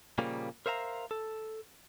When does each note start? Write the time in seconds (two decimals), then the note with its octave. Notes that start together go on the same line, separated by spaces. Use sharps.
0.18 A#2 C#3 F3 G3 A#3
0.66 A#4 C5 E5 F5 A#5
1.11 A4